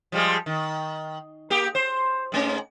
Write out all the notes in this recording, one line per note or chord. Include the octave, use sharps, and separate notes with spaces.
F3 G3 G#3
D#3
A#3 G4
C5
G#2 A3 C#4